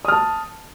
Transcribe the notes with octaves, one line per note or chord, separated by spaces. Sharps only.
A5 D#6 F6